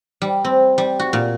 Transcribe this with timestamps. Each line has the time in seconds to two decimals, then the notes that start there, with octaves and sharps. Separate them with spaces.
0.22 G3
0.44 C4
0.78 G3
0.99 F#4
1.13 A#2